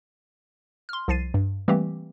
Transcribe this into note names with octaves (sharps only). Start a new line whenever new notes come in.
C6 F6
C2 F3 A6 C7 D#7
G2
E3 G3 A3 A#3 C4 G4